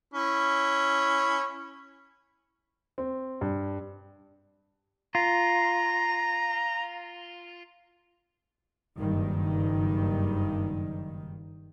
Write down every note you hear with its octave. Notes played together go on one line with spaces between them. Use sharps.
C#4 E4
C4
G2
F4 A#5
F#1 G2 D#3